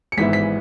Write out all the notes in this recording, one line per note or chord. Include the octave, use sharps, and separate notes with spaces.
C#7
G#1 G#2 E3 B3 E4 B6
B6